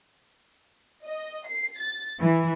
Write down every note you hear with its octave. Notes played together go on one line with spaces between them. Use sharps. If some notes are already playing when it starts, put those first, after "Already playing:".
D#5
C7
A6
E3